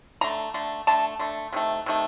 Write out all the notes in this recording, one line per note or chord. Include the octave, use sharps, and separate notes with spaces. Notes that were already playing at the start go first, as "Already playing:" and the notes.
D3 A3 A#5
D3 A3
D3 A3 A5
D3 A3
C3 D#3 A3
C3 D#3 A3